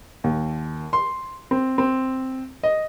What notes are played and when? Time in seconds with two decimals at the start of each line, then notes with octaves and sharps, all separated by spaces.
0.24 D#2
0.93 C6
1.51 C4
1.78 C4
2.63 D#5